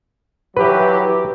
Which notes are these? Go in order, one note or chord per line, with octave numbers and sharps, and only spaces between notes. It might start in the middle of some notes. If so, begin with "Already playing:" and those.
E3 F#3 G4 B4